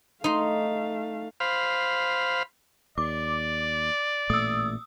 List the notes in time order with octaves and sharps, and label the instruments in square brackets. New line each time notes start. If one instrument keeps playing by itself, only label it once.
[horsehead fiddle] A3 F5 [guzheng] D#4 C6
[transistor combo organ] C5 F5 B5
[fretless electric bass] D#2 [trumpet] D5 [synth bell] D6
[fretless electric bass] A1 A#2 A3 [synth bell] D#6 E6